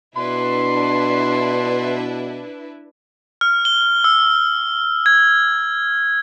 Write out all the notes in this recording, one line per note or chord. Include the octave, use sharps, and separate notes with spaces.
B2 D4 E4 B4 C6
F6
G7
E6
G#6